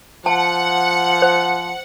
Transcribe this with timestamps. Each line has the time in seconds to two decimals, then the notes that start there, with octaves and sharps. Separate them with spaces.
0.26 F3 F#5 A5
1.22 C5